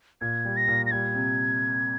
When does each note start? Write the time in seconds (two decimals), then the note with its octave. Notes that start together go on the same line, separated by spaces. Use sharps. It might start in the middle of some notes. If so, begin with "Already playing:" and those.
0.21 A#2 G#6
0.45 G3
0.57 A#6
0.68 A#2
0.86 A#6
0.91 G3 G#6
1.15 C3